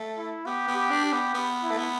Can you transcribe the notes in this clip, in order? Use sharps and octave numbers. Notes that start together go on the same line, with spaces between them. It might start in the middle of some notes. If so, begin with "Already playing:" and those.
Already playing: A3
E4
B3 G4
B3
G4
D4
G4
B3
B3
E4
A3
B3